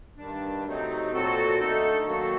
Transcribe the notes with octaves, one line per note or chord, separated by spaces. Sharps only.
G2 D#3 G3 D4
C3 F#3 A3 C4 D#4
A#2 F#3 C4 F#4 A4
D3 A3 D#4 A4
D#3 F#3 A#3 F#4 A4